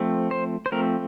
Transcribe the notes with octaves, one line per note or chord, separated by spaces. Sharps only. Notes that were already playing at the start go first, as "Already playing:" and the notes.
Already playing: F3 A3 C4
C5
C5
F3 A3 C4 A#4